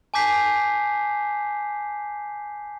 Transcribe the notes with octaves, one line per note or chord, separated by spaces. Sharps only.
G#5 A5 D6 G6 B6 C7